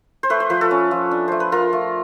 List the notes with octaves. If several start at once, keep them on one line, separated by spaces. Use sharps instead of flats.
C5
A3 B4
C5
F3 B4
A4
C#4
F3
D4
A3 C5
B4
F4 A#4
A3